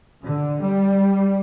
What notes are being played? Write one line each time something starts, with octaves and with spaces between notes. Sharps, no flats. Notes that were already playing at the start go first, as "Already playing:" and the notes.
D3
G3